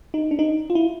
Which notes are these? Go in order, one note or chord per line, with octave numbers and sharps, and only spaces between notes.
D#4
D4
D#4
F4
E4